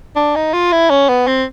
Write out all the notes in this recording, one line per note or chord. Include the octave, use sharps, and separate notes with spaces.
D4
D#4
F4
E4
C#4
B3
C4